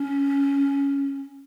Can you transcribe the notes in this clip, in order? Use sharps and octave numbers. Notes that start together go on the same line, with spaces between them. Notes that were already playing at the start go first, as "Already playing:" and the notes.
Already playing: C#4